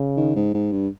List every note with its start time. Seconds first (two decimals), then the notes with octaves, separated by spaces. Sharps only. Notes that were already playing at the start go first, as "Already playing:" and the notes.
Already playing: C#3
0.17 D#3
0.36 G#2
0.54 G#2
0.72 G2